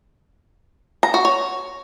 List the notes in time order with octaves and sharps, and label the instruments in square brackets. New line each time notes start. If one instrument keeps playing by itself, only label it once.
[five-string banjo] A#5
F#4
C#5